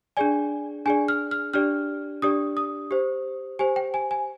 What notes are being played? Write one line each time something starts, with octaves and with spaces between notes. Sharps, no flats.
D4 G#4 D5 G#5
D4 G#4 D5 G#5
F6
F6
D4 G4 D5 F6
D4 G4 D5 D#6
D#6
G4 C5
G4 C5 G#5
G5
G#5
G#5